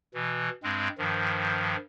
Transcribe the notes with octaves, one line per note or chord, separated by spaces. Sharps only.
B2 E3
G2 G#3 C4
G2 D#3 F3